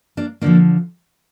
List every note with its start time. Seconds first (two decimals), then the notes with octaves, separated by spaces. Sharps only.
0.17 A#3 D4
0.41 D3 F3 A#3 D4